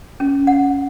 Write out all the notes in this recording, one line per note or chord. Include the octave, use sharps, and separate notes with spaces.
C#4
F#5